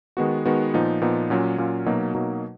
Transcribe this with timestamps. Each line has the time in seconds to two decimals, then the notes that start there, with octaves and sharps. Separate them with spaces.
0.17 D#3 G#3 B3 F#4
0.45 D#3 G#3 B3 F#4
0.74 A#2 F3 B3 D#4
1.01 A#2 F3 B3 D#4
1.30 A#2 F#3 C#4 F4
1.58 A#2 F#3 C#4 F4
1.86 B2 F#3 A#3 D#4
2.14 B2 F#3 A#3 D#4